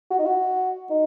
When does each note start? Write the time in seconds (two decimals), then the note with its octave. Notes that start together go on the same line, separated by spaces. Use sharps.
0.11 F#4
0.19 D#4
0.26 F#4
0.90 D#4